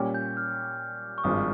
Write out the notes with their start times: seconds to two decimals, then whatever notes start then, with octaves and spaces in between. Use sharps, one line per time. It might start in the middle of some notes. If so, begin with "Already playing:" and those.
Already playing: A#2 G3 C#4
0.15 G6
0.37 F6
1.18 C#6
1.24 G#1 G2 F3 G#3 D#6